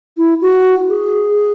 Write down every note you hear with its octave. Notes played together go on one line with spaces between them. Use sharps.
E4
F#4
G#4